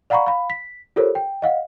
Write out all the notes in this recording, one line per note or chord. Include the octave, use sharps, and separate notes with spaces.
D5 F5 F#5 A#5 B5 C#6
F5 B5
B6
F4 G4 A4 A#4 C5 C#5
G5
D#5 F5 F#5